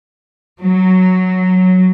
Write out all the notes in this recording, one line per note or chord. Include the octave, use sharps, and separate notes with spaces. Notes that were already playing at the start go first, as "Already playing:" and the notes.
F#3